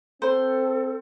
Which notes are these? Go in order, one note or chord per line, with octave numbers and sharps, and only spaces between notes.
C4 A4 C5